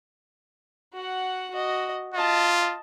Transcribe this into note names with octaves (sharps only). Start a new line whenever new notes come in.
F#4 F#5
F#4 D#5
F4 D#5 A5